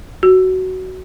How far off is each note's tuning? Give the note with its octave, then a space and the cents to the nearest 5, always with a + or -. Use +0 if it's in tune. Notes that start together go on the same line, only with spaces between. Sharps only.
F#4 +10